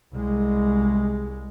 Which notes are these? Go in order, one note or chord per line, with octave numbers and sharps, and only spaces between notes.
C2 G#3